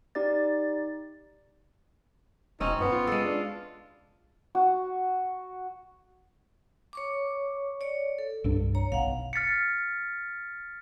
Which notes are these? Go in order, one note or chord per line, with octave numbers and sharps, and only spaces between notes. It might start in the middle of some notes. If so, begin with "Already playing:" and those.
D#4 G4 D5 A6
E1 C4 C#4 D#4
F#2 B3
F4
G#3 A4
D4
F#4
C#5 C#6 D6
C#5 D5
A4
C2 G2 D4
C#5 A#5
F#1 B1 F5 F#5
F6 A6 B6 C#7